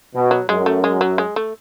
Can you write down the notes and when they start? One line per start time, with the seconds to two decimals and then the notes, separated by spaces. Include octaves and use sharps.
0.14 B2
0.31 F#3
0.49 F#2 G#3
0.66 A3
0.84 G#3
1.01 F#3
1.18 G#3
1.36 A3